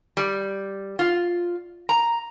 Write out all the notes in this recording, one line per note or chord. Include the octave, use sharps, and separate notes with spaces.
G3
F4
A#5